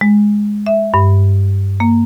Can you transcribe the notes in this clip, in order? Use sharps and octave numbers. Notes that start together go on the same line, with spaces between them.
G#3
E5
G2
A#3